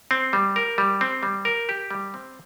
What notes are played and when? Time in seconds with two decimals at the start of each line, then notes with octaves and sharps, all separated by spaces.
0.11 C4
0.33 G3
0.56 A#4
0.78 G3
1.01 C4
1.23 G3
1.45 A#4
1.69 G4
1.91 G3
2.14 C4